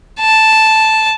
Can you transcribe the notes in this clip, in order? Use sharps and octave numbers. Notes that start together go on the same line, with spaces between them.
A5